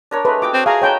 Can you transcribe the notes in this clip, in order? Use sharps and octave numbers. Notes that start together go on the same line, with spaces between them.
D4 A#4 C#5
G#3 A3 B4
F#4 D#5 G5 D6
C4
G#4 D5 F5 A#5
D#4 B4 C#5 G5 A5 A#5